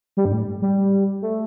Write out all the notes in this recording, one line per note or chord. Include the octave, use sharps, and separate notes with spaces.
G3
G2
A2
G3
A3